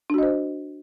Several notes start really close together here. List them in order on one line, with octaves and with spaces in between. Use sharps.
D4 F#4 D#5 C5